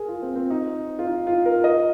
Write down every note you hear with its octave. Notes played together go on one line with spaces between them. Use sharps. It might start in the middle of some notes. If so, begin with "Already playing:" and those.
Already playing: G#4 A#4
F4
C4
C4
D#4
F4
D#4
F4
A#4
D#5